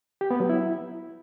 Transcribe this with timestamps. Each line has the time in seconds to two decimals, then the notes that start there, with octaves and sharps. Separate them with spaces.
0.21 G4
0.31 B3
0.40 F#3
0.49 E4